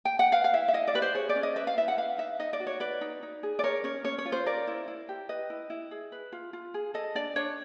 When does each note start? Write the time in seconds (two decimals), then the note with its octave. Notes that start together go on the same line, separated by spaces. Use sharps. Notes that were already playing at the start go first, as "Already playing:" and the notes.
0.05 G5
0.19 F#5
0.32 B4 F5
0.44 F5
0.53 E4 E5
0.68 E5
0.73 E4 D#5
0.87 D5
0.94 G4 B4
1.02 C5
1.15 G#4 C#5
1.29 D5
1.36 C#4
1.43 D#5
1.56 B4 E5
1.67 F5
1.77 E4 E5
1.88 F#5
1.98 B4 F5
2.18 D#4 E5
2.39 D#4 D#5
2.53 D5
2.60 F#4
2.67 C#5
2.80 B4 D5
3.01 D#4
3.23 D#4
3.43 G#4
3.59 D5
3.64 A#4 C#5
3.84 C#4 C#5
4.05 C#4 C#5
4.18 C#5
4.26 F4
4.32 C5
4.46 A#4 D5
4.67 E4
4.88 E4
5.09 G4
5.29 B4 D#5
5.50 E4
5.70 E4
5.91 G#4
6.12 B4
6.32 F4
6.53 F4
6.74 G#4
6.94 A4 D#5
7.15 D4 D5
7.36 D4 C#5